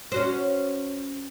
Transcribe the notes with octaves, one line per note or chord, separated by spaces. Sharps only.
C#4 F#4 C5